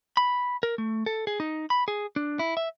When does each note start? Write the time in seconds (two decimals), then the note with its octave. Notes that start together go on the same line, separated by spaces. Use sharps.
0.17 B5
0.63 A#4
0.78 A3
1.06 A4
1.27 G#4
1.40 D#4
1.70 B5
1.88 G#4
2.16 D4
2.39 E4
2.57 E5